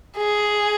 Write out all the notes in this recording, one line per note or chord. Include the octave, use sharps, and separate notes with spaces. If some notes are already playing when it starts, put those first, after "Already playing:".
G#4